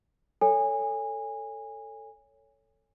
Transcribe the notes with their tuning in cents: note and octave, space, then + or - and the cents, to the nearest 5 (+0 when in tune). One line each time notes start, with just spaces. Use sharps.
A4 +15 C#5 +10 G#5 -20